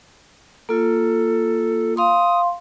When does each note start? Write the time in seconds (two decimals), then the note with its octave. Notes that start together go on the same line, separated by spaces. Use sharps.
0.69 A#3 F4 A4
1.97 F5 C6 D#6